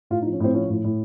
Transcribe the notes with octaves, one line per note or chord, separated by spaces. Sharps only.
A2 F4
D#4
F3
C#4
A2 C4
F3 C#4
A2
A2